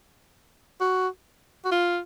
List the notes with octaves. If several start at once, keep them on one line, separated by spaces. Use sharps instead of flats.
F#4
F#4
F4